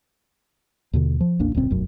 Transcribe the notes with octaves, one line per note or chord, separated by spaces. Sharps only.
D#2 B2 D3
F3
A1 D#2 A#3 D4
D#1 C#2 A#2 C4
F1 B1 F#2